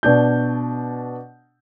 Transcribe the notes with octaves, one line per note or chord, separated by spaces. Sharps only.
B2 D4 G6